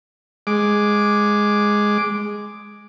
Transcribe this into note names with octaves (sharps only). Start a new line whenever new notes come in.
G#3 D6